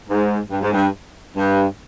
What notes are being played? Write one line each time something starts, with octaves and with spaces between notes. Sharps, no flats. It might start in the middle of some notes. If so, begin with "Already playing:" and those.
G#2
G2
G#2
G2
G2